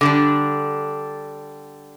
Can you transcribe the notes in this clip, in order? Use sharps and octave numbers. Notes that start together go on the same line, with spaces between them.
D3 G3 D4